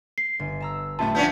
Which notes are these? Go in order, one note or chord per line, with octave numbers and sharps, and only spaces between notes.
C7
G1
A5 A#5 E6
F#2 A2 A3 F4 E5 A5
F3 B3 C#4 D4 G6 B6